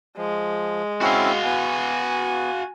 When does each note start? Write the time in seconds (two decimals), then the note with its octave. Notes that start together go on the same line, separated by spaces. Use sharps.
0.18 F3 G#3
1.01 C4 C#4 E4 F#4 F5
1.44 B3 G#5